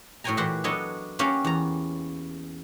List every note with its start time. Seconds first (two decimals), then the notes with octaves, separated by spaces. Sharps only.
0.24 A2 F#4 C#5 G5 G#5 A#5
0.37 A#2 E3 F#4 G4 F#5 C6
0.64 F#3 B3 D4 A4 C#5 D#5
1.19 A#3 C#4 F#4 G4 F5
1.44 E2 A#5